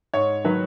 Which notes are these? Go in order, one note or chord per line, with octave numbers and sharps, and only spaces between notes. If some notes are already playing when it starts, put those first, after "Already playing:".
G#2 C#5
D#3 F#3 B4